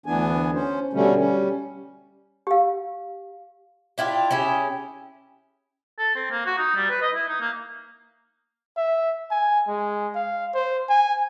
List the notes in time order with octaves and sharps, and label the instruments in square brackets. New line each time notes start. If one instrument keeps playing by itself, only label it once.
[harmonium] D2 E3 B3 D4 G#5
C#4 C5
B2 D3 G3 A3 C#4
G3 C#4
[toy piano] G4 F5
[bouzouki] D4 E4 F4 G4
C#4 E4 G4 G#4
[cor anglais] A4
C4
A#3
F#4
D#4
G3
B4
D#5
E4
D#4
A#3
[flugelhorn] E5
G#5
G#3
F5
C5
G#5